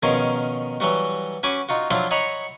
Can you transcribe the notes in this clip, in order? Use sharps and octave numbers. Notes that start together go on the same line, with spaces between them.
B2 D#3 F3 C#4 G#4 A#4
E3 F#3 G3 F#4
C#4 F#4 G#5 B5 D6
D#4 F4 F#4
F3 F#3 C4 D4 E4 F4
C#5 D#5 F#5 A#5 B5